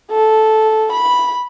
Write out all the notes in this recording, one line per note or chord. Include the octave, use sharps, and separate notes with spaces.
A4
B5